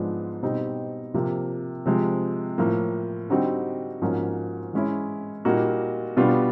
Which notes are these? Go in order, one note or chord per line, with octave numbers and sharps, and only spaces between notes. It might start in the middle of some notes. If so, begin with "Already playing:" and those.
Already playing: G#2 F3 G#3 B3 D4
B2 G3 C4 D#4
C3 F3 A#3
C3 F3 G#3
A2 F3 A#3
D3 G3 C4 D#4 F#4
G#2 F3 A#3 C#4 F#4
E3 G#3 C#4 E4
A#2 G3 A#3 D#4 F#4
B2 G3 B3 D4 F4